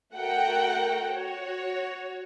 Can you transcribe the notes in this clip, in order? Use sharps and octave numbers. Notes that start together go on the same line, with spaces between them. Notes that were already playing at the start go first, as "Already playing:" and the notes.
A3 F#4 A#4 F#5 G5
F#4 C#5